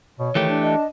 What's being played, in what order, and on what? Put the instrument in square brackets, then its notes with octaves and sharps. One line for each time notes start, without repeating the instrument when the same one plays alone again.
[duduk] B2 [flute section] C#5
[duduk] D#3 [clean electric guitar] E3 A3 G4
[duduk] D4
[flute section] D#5 A5